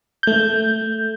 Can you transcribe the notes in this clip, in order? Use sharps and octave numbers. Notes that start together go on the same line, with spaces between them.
A3 G6